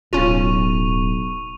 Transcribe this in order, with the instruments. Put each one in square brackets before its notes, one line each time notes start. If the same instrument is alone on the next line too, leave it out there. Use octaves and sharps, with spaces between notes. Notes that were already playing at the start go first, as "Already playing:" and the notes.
[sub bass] D1 [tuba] B1 [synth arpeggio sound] C#4 F4 [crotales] C#6 D#7 F7